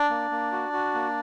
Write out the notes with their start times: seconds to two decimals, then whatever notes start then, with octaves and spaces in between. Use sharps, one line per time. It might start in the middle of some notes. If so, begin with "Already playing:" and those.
Already playing: D4 D5
0.10 A#3
0.31 A#3
0.52 F#4
0.73 F#4
0.94 A#3